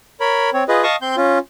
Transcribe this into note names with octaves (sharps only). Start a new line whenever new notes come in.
A#4 C#5 B5
C4 C#5
F4 G#4 B4 D#5
D#5 F5 A5 C#6 D#6
C4 C6 G6
C#4 F4